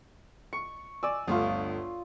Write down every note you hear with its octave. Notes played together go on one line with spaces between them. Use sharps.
C#6 C#7
D5 G#5 E6
G1 D2 F4 C#6 D#6